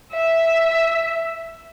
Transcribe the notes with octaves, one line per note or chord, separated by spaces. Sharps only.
E5